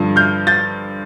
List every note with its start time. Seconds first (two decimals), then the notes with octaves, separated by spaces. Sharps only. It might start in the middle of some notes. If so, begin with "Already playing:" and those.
Already playing: G2 D3 F3
0.16 F6 G6
0.47 G6 A6